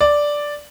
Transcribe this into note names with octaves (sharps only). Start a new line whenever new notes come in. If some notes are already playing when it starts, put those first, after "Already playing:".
D5